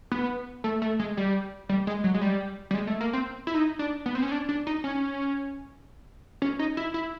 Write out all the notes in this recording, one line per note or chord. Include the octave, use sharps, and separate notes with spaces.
B3
A3
A3
G#3
G3
G3
G#3
F#3
G#3
G3
G3
G#3
A3
A#3
C4
E4
D#4
D4
B3
C4
C#4
D4
D4
D#4
C#4
C#4
D#4
E4
E4